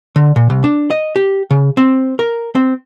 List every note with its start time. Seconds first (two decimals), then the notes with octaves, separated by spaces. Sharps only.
0.16 D3
0.36 A#2
0.50 C2
0.64 D4
0.90 D#5
1.16 G4
1.51 C#3
1.77 C4
2.19 A#4
2.55 C4